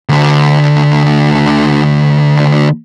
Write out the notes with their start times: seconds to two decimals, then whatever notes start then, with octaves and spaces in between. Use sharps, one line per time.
0.09 D2 D3